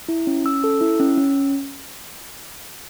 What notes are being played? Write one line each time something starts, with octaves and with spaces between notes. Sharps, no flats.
E4
C#4
C#4 E6
A4
E4
C#4
C#4